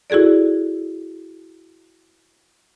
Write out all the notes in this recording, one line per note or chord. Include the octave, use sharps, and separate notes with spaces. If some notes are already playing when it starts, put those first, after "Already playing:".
E4 F#4 G#4 A4 D5